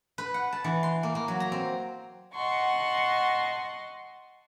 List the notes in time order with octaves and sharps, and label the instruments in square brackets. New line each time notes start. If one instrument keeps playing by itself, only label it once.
[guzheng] B4
F#5
A5
E3
C6
A#3
A#3
F#3
A#5
C4
[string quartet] D#5 F#5 A5 C6 C#6